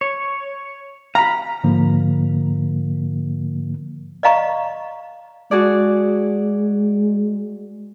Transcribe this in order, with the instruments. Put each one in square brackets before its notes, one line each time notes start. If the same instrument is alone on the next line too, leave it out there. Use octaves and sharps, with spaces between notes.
[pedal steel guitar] C#5
[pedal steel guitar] F5 B5 [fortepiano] A#5
[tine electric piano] G#2 D3 F3 A#3
[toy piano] D5 D#5 F5 A#5 C#6
[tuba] G#3 [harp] F#4 G#4 D5